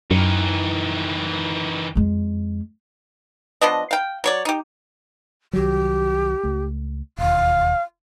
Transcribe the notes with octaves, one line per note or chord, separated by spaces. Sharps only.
F#2 D#3 E3
F2 G#3
F3 B3 D4 D#5
F5 G5
F#3 C#5 D5
D#4 G4
C2 D#3 F#3 G4
C#2 A3
E1 D#2 F5